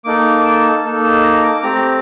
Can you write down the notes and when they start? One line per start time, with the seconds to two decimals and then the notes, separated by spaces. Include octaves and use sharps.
0.04 A#3 D#4 A4 D6
0.44 A5
0.84 A#3 D#4 A4
1.04 A5
1.23 A#5
1.43 D6
1.62 A3 C4 G4 A#5